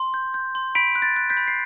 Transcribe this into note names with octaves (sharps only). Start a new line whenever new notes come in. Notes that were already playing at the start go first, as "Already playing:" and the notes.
Already playing: C6
G6
G6
C6
B5 B6 D7
F#6
A6
F#6
G6 B6
B5
C7